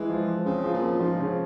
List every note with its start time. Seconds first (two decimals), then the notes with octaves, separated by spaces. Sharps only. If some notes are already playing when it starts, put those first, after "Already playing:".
Already playing: E3 G#3
0.10 F3
0.28 F3
0.45 C#3 C4
0.64 F3
0.74 A#2
0.83 F3
1.00 G#2 F3
1.19 C#3